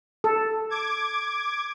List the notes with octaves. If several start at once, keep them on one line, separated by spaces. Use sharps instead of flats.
A4
D6 G#6